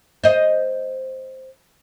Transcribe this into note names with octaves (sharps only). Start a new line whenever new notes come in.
C5 D#5